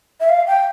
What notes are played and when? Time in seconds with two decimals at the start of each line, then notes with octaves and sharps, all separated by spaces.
0.20 E5
0.29 F5
0.47 G5